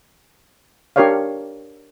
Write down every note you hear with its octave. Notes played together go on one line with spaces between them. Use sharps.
D4 G4 A#4 C#5 D5 F5